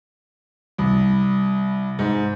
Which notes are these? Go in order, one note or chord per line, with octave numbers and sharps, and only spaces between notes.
C2
G#2